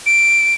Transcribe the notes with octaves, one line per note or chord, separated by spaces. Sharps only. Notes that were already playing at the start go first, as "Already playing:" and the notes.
D7